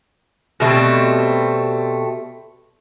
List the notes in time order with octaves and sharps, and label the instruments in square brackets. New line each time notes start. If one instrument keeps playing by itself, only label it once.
[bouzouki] B2 G3 A3 C4